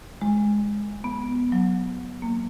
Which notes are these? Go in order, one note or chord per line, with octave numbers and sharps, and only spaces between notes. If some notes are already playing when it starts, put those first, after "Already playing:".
G#3
B3
F#3
A#3